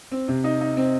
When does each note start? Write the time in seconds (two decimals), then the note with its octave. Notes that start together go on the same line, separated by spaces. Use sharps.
0.12 C4
0.28 C3
0.44 D#4
0.61 D#4
0.77 C4